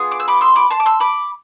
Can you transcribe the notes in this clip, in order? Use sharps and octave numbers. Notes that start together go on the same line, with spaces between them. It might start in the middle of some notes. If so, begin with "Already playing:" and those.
Already playing: B3 F4 G#4
D6
E6
B5 D6
C6 E6
B5 D6
A5 C6
D6
C6 E6
B5 D6